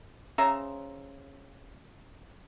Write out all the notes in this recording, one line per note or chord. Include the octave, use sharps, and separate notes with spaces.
C#3 C5 E5 A#5